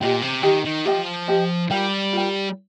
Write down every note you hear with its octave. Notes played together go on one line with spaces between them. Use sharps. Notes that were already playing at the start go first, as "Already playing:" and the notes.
A#2 G4 D#5 G5
C3
D#3 G4 D#5 G5
D#3
F3 G4 D#5 G5
G4 D#5 G5
G3 F4 A#4 G5
F4 A#4 G5